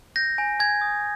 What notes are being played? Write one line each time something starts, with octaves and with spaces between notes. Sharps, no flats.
G6 A#6
G#5
G#5 G#6
D#6